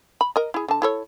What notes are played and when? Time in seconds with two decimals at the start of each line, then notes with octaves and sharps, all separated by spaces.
0.21 B5
0.36 A#4 D#5
0.54 E4 G#4
0.68 D3 A5
0.82 E4 A4 C#5